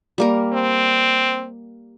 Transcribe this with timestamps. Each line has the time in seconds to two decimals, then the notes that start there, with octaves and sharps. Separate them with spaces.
0.18 G3 A#3 A#4
0.53 C4